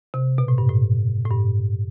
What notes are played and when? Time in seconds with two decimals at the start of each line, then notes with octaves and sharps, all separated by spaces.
0.14 C3
0.38 B2
0.48 A2
0.58 G2
0.69 A2
1.25 A2
1.31 G2